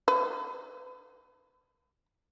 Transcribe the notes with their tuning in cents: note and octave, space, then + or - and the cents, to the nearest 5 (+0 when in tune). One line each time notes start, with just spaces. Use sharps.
B4 +35